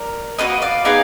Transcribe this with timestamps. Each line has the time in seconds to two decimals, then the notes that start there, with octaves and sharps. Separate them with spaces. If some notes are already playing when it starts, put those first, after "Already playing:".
Already playing: A#4 D5
0.38 A#3 D4 F#4 B4 D#5
0.62 D5 F5
0.85 B3 D#4 G#4 D5 F5